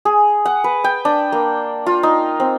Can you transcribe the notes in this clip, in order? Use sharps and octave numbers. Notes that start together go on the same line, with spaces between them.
G#4
F#5
B4
G5
D4
A#3
F4
D#4
C4